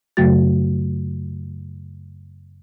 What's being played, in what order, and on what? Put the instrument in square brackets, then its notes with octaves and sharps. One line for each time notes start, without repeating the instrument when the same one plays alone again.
[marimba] F#2 C#3 F#3 A3 F#4 A6